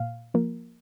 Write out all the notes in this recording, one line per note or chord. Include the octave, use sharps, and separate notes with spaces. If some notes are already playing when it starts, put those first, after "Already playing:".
Already playing: A#2 F5
F3 A#3